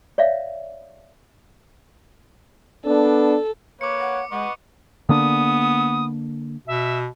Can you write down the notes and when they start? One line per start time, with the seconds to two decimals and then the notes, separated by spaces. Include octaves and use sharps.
0.18 C#5 D5 E5 F5
2.85 B3 D4 A4
3.81 A#3 B4 C#5 D6 C#7
4.00 F#5
4.32 G#3 B4 D#5 F#5 C#6
5.09 D3 A#3 B3 D4 D#6
6.67 B2 E5